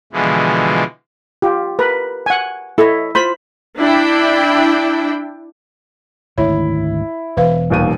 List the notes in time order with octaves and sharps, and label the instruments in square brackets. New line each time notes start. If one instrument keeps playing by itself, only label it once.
[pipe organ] B2 D3 E3 F3 G#3
[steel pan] F4 G4
[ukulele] A#4 [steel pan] B4
[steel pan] F#5 G#5
[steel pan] E4 [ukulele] A4 C#5 D#5
[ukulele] F4 C5 [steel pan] B5
[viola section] D4 E4 G5
[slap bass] G#1 D2 D#3 [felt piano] E4 [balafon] C#5
[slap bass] E1 [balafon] E3 B4 F5
[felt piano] D#1 D#2 D#7